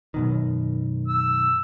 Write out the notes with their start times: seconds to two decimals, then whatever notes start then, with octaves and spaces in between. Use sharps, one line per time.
0.14 F#2 B2 D#3
1.08 E6